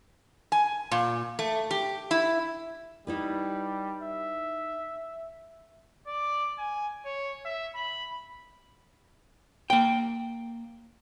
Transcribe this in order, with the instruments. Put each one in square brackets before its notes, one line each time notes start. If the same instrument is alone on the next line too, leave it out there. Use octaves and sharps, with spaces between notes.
[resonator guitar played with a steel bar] G#5
A#2
A3
G4
E4
[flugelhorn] G3 [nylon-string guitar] D#4 E4 B4
[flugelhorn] E5
[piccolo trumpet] D5
G#5
C#5
E5
B5
[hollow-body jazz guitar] A#3 G5